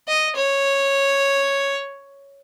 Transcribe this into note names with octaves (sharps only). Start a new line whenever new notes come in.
D#5
C#5